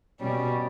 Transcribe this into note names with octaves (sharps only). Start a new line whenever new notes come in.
B2 G3 C#4